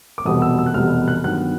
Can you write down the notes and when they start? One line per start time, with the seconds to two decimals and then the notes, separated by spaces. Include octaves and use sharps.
0.18 D6
0.25 F1 E2 B2 G3 B3 D#6
0.42 E6
0.59 E6
0.66 F#6
0.74 F1 E2 B2 G3 B3 F6
1.08 F#6
1.24 G2 D#3 F#3 B3 F#6